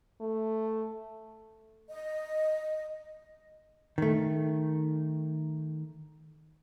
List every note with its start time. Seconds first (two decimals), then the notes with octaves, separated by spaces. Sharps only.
0.21 A3
1.90 D#5
3.98 D#3 A3